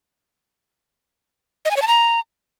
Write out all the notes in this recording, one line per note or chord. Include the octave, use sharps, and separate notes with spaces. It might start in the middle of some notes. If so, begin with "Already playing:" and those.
D#5
G#5
C#5
A5
A#5